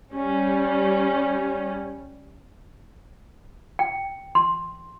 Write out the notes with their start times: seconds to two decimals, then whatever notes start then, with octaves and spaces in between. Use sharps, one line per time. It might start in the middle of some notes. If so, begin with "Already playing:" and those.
0.13 G3 C#4
3.79 G5
4.35 C6